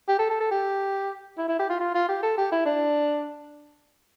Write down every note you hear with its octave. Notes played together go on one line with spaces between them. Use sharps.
G4
A4
A4
A4
G4
E4
E4
G4
F4
F4
F4
G4
A4
G4
E4
D4